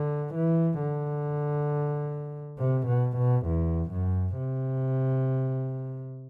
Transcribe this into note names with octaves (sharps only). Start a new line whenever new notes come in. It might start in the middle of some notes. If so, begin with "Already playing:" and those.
Already playing: D3
E3
D3
C3
B2
B2
E2
F#2
C3